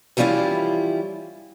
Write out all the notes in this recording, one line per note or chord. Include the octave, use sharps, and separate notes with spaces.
E3 F3 G3 C#4 E4 F4